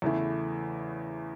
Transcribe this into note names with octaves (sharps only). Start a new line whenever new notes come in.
E2 C#3 E3 A3 E4